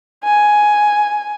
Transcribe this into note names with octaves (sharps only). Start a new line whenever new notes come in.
G#5